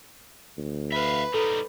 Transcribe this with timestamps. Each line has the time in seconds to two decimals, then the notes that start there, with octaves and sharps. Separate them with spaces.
0.58 D2
0.92 B4 E5 F5
1.34 G3 D#4 A4